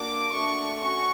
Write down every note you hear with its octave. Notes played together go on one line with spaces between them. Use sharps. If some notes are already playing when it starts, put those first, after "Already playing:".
Already playing: A#3 D4 F#4 D6
A3 D4 F#4 C#6
C#4 F#4 C#6